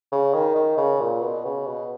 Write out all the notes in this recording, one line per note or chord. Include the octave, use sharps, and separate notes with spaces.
C#3
D#3
D#3
C#3
A#2
B2
C#3
B2